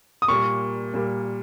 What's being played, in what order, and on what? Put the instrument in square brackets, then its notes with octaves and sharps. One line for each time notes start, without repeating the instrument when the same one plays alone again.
[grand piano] D#6
[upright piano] A#2 G3 A#3 [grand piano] C#6
[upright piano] A#2 G3 A#3